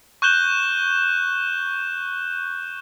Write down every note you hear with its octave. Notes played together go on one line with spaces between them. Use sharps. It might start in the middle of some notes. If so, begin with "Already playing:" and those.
C#6 F#6 G6 E7 G7